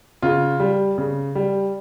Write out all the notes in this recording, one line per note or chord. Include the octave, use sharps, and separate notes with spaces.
C#3 F4
G3
C#3
G3